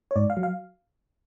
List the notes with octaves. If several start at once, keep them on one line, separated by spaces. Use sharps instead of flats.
C#5
G#2 D5
F5
F#3
F5